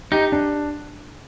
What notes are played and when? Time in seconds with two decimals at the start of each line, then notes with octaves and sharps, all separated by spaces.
0.12 D#4 G4
0.32 D4